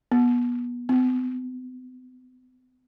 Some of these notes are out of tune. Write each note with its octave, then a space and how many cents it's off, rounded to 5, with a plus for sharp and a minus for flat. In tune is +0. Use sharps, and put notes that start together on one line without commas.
B3 -25
B3 +45